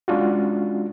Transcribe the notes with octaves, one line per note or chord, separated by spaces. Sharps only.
G#3 C#4 D4 F4 F#4